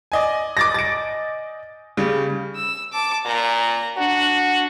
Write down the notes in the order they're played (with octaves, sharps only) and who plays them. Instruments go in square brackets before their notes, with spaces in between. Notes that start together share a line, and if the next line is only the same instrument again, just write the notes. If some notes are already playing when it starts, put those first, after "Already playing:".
[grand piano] D5 D#5 G#5
[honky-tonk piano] D6 A6 A#6
A6 D7
[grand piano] C#3 G3
[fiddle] E6
A5 D6
[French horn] A#2 [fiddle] A#5
[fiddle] D4 [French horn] F#4